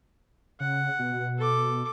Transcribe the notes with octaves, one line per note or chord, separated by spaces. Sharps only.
C#3 F#5
B2
A4 D6